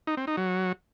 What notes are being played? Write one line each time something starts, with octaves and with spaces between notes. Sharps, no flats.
D#4
C4
D#4
F#3